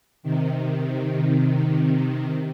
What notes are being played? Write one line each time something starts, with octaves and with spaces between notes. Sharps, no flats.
C3 D#3